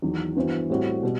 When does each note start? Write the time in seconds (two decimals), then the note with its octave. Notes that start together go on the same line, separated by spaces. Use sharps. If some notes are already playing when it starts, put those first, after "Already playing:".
0.02 E2 D#3 F#3
0.36 G2 E3 B3 F#4 C5
0.70 A2 G3 C4 F#4
1.03 B2 G3